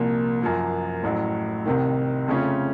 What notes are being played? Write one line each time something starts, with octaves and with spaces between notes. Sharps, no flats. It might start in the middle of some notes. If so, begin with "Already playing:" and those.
Already playing: C2 A#2 F3 A#3
F#2 F3 A#3
A1 A2 F#3
C2 C3 D#3
F2 C#3 A3 C#4 F4